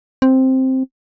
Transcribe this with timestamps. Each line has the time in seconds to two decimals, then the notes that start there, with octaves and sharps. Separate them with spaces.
0.22 C4